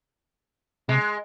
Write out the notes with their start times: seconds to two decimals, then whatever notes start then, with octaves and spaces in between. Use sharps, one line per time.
0.89 C3 G#3